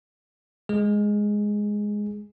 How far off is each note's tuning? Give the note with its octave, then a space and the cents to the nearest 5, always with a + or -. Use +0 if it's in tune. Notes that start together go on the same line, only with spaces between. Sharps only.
G#3 +0 G#4 +0